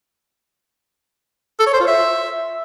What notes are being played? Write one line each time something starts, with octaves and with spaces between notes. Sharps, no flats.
A4
C#5
C5
F4
E5